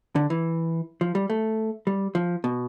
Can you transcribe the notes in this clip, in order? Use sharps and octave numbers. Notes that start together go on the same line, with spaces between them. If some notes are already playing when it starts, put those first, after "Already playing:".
D3
E3
F3
G3
A3
G3
F3
B2